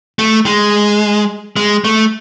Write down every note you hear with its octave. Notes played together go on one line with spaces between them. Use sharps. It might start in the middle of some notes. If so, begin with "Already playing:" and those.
A3
G#3
G#3
A3